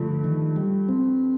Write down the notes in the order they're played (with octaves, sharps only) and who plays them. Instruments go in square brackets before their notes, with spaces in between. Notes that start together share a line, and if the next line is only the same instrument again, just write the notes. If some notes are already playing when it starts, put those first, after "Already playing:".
Already playing: [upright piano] G2 F3 A3 [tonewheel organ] D3
[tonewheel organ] D#3
G3
C4